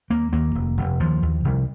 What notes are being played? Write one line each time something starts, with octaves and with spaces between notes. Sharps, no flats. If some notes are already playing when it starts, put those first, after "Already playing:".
D#2 A#3
D#2 A#3
F1
F1
D#2 F3
D#2
C2